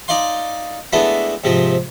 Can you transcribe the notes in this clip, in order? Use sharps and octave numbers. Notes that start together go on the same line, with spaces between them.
D#4 D5 F5 C6
G#3 A3 B3 D4 E4
G#2 C3 F3 C4